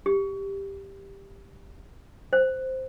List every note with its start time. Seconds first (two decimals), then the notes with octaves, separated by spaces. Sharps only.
0.06 G4
2.33 C5